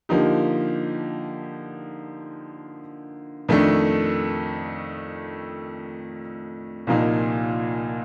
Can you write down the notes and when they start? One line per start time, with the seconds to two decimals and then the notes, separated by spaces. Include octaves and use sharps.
0.09 D3 F3 A#3 D#4 G4
3.49 F2 D#3 A3 D4 A4
6.87 C2 A#2 F3 A#3 D#4